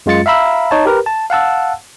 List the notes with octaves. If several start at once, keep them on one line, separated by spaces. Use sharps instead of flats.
F#2 G#3 F4 A6 C#7
E5 F5 A#5 B5 E6
D#4 C#5 A5
G4 A#4 B4
A5
F5 F#5 A5 E6